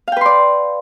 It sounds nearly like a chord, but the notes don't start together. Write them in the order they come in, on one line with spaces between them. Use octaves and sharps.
F5 G5 B4 C6 D5